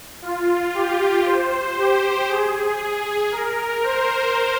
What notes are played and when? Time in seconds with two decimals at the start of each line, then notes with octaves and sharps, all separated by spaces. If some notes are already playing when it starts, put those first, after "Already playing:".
0.22 F4
0.74 G4
1.26 C5
1.77 G4
2.29 G#4
3.32 A#4
3.83 C5